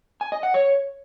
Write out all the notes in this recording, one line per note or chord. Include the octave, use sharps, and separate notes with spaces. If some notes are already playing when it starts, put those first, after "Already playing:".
G#5
D#5
F#5
C#5